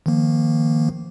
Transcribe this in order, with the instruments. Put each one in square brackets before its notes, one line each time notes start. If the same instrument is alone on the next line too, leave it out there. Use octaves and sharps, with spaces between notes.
[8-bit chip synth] D#3 F3 A#3